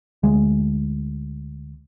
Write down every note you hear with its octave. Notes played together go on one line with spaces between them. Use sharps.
D2 G#3